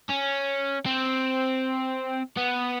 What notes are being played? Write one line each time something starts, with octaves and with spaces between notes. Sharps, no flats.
C#4
C4
B3